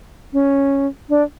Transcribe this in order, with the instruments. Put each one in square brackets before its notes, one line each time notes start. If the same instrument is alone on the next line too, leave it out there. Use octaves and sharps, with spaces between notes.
[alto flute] C#4
D4